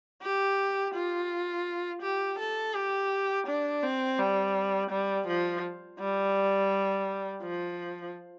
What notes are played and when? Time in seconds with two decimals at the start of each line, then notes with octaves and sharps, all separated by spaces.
0.22 G4
0.94 F4
2.02 G4
2.39 A4
2.74 G4
3.47 D4
3.83 C4
4.18 G3
4.90 G3
5.27 F3
5.99 G3
7.42 F3